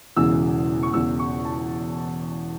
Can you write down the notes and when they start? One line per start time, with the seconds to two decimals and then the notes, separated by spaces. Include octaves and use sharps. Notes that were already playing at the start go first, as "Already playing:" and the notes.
0.16 E1 E2 C#3 E3 E6
0.83 C#6
0.93 E1 E2 C#3 E6
1.19 C#6
1.45 A5